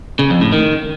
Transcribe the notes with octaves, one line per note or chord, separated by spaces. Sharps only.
C#3
F2
A2
D#3